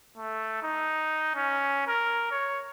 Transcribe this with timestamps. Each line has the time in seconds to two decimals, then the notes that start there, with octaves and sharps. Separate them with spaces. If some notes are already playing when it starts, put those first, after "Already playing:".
0.18 A3
0.63 D#4
1.36 C#4
1.88 A#4
2.32 C#5